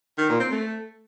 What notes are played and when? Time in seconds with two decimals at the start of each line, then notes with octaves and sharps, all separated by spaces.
0.18 D#3
0.29 A#2
0.40 C4
0.51 A3